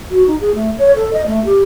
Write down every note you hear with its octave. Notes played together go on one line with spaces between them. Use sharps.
F#4
D#4
G#4
A3
C#5
A4
D#5
A3
G4